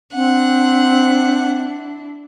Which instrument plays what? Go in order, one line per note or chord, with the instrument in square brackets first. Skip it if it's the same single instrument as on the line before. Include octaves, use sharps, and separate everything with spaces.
[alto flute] C4 [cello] D4 E4 [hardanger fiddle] F#5